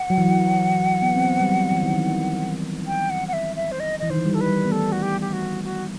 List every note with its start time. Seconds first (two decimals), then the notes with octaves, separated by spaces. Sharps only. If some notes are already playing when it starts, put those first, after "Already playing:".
Already playing: F#5
0.10 F#3
0.18 E3
0.25 F#3
1.02 B3
1.15 C4
1.25 B3
1.40 G3
1.49 F#3
1.72 E3
1.83 D#3
1.94 E3
2.87 G5
3.10 F#5
3.28 F#5
3.33 E5
3.56 E5
3.72 C5
3.80 D#5
3.99 E3 D#5
4.10 D#3 C5
4.17 E3
4.25 G3
4.34 A4
4.41 B4
4.48 G3
4.65 B3
4.72 A3 A4
4.92 F#4
5.02 G4
5.21 G4
5.33 F#4
5.64 F#4